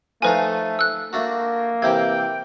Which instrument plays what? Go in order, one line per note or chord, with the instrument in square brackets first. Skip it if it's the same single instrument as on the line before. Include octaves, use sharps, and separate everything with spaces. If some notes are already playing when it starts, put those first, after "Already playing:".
[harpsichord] F3 D#4 F4 [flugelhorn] A3 [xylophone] B4 G#5
[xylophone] E6 F#6
[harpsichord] A3 D4 F#4 [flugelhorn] A#3
[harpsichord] C3 E3 G4 [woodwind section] G5 [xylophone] G#6